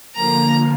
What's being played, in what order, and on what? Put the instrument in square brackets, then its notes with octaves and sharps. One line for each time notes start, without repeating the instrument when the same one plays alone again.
[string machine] D3 F3 A#3 [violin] A#5